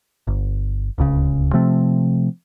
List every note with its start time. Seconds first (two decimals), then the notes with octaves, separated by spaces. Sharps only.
0.27 G1
0.98 D1 C#2 C#3
1.53 C3 F3 A3 C4